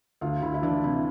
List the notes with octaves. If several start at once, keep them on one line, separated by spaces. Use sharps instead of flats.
D2 F4
D2 E4
E4
E3 D4
C3 E4